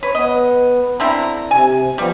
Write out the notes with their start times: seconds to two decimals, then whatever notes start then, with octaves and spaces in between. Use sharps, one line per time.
0.03 B4 C#5
0.15 B3 D#5
1.00 D3 C4 E4 A#5
1.51 C3 G#5
1.98 F3 G3 B3